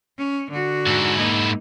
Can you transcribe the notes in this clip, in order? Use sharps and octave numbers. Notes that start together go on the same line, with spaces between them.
C#4
D3 F#4
G#2 E4
A#3 D#4